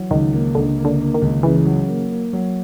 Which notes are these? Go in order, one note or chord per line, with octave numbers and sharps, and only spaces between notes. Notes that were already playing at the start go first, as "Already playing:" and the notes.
Already playing: E3 F#3
C#2 D#3
A#3
C#2 D3
A#3
D3
A#3
D#3
C#2
C#3 E3
F#3
A#3
A#3
F#3